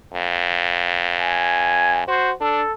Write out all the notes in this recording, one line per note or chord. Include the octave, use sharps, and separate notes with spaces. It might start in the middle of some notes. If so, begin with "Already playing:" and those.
F2
G#5
F#4 C5
D4 A4